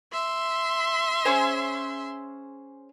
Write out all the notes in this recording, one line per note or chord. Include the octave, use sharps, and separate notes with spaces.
E5 C6
C#4 G#4 C5